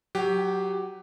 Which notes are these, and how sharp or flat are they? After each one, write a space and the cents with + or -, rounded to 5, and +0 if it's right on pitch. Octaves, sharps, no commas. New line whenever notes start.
F#3 +0 G4 +0 F#5 +30